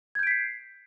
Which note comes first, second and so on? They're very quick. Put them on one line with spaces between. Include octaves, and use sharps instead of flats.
G#6 G6 D7 B6 C7